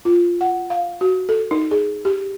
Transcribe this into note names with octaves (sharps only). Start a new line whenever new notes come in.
F4
F#5
F5
F#4
A4
D#4
G#4
G4